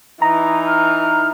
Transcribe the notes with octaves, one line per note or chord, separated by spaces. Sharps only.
E3 D#4 A#5
F6